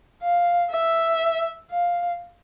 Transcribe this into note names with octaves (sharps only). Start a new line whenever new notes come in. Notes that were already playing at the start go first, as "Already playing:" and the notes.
F5
E5
F5